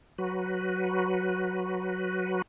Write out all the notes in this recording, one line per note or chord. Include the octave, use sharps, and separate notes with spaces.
F#3 F#4 B4